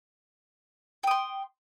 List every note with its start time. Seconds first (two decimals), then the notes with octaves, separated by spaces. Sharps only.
1.03 G5
1.07 D#6
1.11 C6